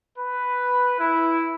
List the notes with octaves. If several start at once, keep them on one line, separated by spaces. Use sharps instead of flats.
B4
E4